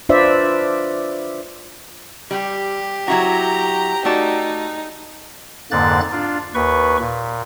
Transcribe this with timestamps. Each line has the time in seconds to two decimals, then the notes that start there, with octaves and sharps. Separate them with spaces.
0.09 D4 F4 B4 C5 D5 E5
2.31 G3 G4
3.08 F#3 E4 F#4 A#5
4.05 A3 D#4 F#4 D5
5.71 F2 G#2 D3 A#3 F#6 A6
6.12 D4 F4
6.54 D#2 B4 C#6
7.00 A#2